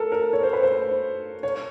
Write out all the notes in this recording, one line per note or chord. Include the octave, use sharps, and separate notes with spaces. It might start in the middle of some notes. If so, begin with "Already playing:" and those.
Already playing: A4 A#4
A#4
C#5
C5
B4
C5
C#5